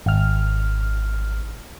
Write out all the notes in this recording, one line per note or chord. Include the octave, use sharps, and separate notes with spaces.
G#1 F6